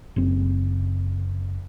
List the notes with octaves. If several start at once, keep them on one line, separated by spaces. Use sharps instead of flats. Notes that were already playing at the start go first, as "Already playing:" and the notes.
F#1 C4